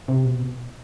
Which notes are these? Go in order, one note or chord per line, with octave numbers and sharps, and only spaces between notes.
C3
B2